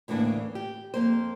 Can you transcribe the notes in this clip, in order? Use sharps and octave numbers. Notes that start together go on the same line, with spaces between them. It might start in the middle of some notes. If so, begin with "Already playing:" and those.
D2 A2 C#3 E3 A#3 D4
G4
F2 A#3 C5